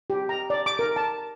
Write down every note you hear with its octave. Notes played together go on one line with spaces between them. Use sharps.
G4
A#5
D5
D6
A#4
A5